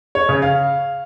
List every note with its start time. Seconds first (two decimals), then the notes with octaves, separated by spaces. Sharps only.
0.15 C#5
0.29 C#3
0.42 F5